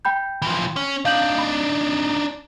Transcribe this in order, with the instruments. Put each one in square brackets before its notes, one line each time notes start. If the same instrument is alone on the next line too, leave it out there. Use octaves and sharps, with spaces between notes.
[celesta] G5 B5 G6
[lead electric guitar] E3 F3
C#4
[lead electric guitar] D4 D#4 [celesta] F5 G6 F#7
[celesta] B5